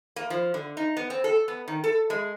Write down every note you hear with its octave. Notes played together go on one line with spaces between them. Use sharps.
A#3
F3
D3
D#4
B3
C4
A4
B3
D#3
A4
G#3